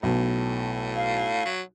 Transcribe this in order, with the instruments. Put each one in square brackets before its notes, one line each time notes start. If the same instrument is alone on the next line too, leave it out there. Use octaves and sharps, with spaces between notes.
[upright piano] B1 [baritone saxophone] A2
[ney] F5
[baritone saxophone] F#3